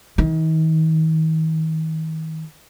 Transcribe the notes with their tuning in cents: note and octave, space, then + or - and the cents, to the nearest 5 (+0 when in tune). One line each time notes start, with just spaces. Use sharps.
D#3 +40